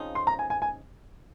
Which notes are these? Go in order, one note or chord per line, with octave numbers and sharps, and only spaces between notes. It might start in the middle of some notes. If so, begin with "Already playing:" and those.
Already playing: C#3 F3 C4 D#4
C6
A#5
G#5
G#5
G#5